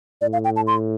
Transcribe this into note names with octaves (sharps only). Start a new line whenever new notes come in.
A2 D5
F5
G5
A5
C6